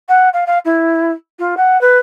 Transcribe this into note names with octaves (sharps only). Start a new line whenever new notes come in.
F#5
F5
F5
E4
F4
F#5
B4